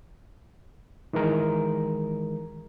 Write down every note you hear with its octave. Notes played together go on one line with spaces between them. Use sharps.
D#3 E3 G#3 A#4